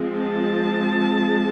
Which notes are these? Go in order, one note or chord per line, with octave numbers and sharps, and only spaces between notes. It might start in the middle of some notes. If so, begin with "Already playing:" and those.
Already playing: F3 G#3 C4
A5